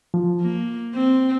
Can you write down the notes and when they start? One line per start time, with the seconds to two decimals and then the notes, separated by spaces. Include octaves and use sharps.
0.14 F3
0.41 A#3
0.95 C4